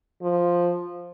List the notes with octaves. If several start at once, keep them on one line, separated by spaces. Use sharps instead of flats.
F3